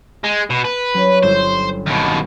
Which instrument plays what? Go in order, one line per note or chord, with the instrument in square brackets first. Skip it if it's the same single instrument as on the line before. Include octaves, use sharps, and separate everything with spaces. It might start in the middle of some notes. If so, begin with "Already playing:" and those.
[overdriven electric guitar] G#3
B2
B4
[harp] F#3 C#4
[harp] G1 A4 E7 [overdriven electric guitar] C5
[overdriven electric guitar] D#2 B2